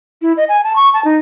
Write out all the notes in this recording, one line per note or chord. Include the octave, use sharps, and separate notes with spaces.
E4
D#5
G#5
A5
C#6
A5
D#4